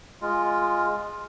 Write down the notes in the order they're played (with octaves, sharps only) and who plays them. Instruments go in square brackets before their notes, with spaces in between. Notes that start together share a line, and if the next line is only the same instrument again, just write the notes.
[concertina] G#3 F4